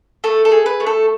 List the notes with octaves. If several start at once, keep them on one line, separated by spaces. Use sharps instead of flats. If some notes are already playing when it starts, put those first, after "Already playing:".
A3 A4
A4
G#4
B4
A3
A4